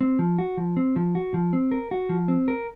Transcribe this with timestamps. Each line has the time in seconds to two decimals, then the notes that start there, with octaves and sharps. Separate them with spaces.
0.01 C4
0.19 F3
0.38 F#4
0.57 F3
0.77 C4
0.96 F3
1.15 F#4
1.34 F3
1.53 C4
1.71 A#4
1.91 F#4
2.09 F3
2.28 C4
2.48 A#4